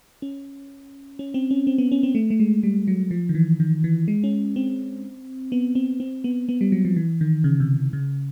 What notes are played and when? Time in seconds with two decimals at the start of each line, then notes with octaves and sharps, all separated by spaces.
0.22 C#4
1.19 C#4
1.34 C4
1.51 C#4
1.67 C4
1.78 B3
1.92 C#4
2.03 C4
2.15 A3
2.30 A3
2.40 G#3
2.63 G3
2.88 F#3
3.11 F3
3.29 D#3
3.35 E3
3.60 D#3
3.84 E3
4.08 G#3
4.24 C#4
4.56 C4
5.52 B3
5.75 C4
6.00 C4
6.24 B3
6.49 B3
6.61 G3
6.72 F#3
6.85 F3
6.96 E3
7.21 D#3
7.44 C#3
7.60 C3
7.93 C#3